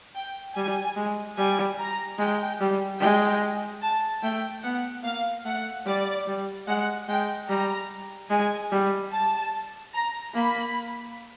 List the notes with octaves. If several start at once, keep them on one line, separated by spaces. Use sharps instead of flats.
G5
G3 G#5
G#3
G3 G#5
A#5
G#3 G5
G3
G#3 G5
A5
A3 G5
B3 F#5
A#3 F5
A3 F#5
G3 D5
G3
G#3 F#5
G#3 G5
G3 A#5
G#3 G#5
G3
A5
A#5
A#3 B5